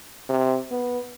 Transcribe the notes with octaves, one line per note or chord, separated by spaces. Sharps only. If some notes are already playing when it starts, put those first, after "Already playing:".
C3
B3